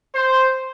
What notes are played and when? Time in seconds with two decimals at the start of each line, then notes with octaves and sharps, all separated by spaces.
0.15 C5